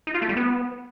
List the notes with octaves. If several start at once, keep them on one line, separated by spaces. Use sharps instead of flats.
D#4
F4
A3
G3
B3